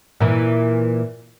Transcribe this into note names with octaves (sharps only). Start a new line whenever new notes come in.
A#2 E3